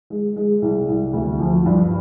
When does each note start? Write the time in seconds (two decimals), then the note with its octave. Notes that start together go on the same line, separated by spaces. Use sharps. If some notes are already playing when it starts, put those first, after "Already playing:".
0.10 G#3
0.36 G#3
0.62 C2
0.88 C2
1.13 D2
1.40 F3
1.66 G2